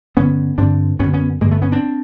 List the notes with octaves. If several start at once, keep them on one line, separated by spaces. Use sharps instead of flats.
G2 D3 B3 C#4
G2 D3 C4 D4
F#2 D3 B3 C#4
B3 C#4
G2 D3 G#3 A#3
A3 B3
B3 C#4
C4 D4